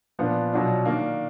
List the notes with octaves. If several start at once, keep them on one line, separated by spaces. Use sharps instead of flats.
A#2 F3 B3 D4
B2 F#3 D4 F4
D#3 A#3 D4